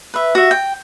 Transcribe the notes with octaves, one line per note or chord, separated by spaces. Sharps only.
B4 E5
F#4 E5
G5